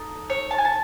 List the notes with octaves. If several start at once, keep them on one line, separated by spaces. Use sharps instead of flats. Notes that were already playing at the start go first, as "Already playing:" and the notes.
Already playing: D#4 A4
C#5
A5
G#5
A5